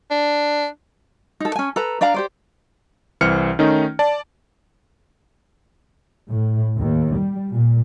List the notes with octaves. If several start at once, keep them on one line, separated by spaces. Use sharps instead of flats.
D4
D#4 A4
C#4 G#5
A4 B4 A#5
D4 D5 F5 A#5
G4 C5 D5
C2 E3 C4 C5 F6 C#7
D#3 A3 C#4 D#4
D5 A5
A2
D#2
G3
A#2